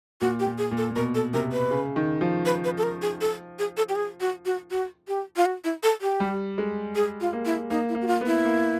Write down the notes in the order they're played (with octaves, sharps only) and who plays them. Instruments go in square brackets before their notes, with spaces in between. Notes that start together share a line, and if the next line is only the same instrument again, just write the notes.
[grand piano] A#2 [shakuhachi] F#4
[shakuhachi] G4
[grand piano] A#2
[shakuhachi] G#4
[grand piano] A#2
[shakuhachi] A4
[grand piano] A#2
[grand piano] B2 [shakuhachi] A#4
[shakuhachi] A4
[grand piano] C3 [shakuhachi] A#4
[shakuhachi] B4
[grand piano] C#3
D#3
F3
[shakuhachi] B4
B4
A4
A#4
G#4
A4
G#4
A4
G4
G#4
F#4
F#4
F#4
G4
F4
F#4
E4
A4
G4
[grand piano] G3
G#3
[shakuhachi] G#4
F4
[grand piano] A#3
[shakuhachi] E4
[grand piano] A#3 [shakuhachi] D#4
[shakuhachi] E4
[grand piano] A#3
[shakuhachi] F#4
F4
[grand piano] B3
[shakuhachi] E4
[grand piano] A#3